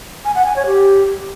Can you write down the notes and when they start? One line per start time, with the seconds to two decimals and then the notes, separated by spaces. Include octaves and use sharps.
0.25 G#5
0.35 F#5
0.46 G#5
0.56 C#5
0.66 G4